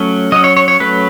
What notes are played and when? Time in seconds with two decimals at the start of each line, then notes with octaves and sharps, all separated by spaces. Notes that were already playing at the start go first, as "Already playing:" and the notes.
Already playing: F#3 A3 C#4
0.32 F#3 D#5
0.36 C#4
0.44 C#5
0.57 C#5
0.68 C#5
0.80 F#3 A3 C#4 B4